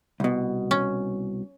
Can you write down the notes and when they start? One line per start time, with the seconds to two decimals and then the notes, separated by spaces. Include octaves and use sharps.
0.20 C2 B2
0.71 C#4